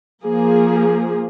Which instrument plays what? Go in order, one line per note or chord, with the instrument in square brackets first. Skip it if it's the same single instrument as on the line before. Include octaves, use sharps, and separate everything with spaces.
[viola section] F3 A#3 G#4